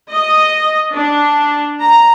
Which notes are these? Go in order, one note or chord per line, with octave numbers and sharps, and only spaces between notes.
D#5
D4
A#5